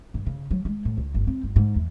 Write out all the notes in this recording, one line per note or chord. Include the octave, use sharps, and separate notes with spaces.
G2
C#3
F#3
G#3
A2
C#2
G1
C4
G1
G#2
E2